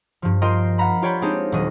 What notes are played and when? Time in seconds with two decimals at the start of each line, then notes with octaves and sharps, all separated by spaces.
0.22 G2 F3
0.42 F4 A#4 D#5 G5 C6
0.78 F5 F#5 A#5 B5
1.02 F4 G4 C#5 D5 G5 B5
1.22 G#3 C4 D4 D#4 G4
1.52 D#1 F#3 D#5